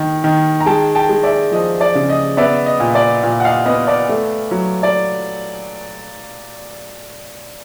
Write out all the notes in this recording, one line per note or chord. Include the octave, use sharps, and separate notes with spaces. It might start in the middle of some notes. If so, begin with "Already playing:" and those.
Already playing: D#3
D#3
A#5
G#3 G5 A5
G5 A5
G#3
D5 E5
F3 D#5
D5
C#3
D#5
B3 D5 E5
D#5
A#2
D5
A#2
F#5
D#5 F5
B3 D#5
D5
A3
F#3
D5